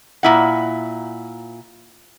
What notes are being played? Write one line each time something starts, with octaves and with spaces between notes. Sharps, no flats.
A#2 E4 F#5